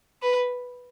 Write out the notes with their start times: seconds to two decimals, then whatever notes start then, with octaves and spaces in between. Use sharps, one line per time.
0.22 B4